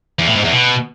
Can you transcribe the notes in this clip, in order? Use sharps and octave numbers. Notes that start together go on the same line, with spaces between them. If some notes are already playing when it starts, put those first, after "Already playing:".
E2
A2
G#2
E2
B2